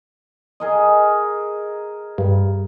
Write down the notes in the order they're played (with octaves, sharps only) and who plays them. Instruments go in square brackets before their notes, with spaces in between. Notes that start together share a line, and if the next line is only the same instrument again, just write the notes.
[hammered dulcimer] G#4 A#4 D#5
[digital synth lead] G2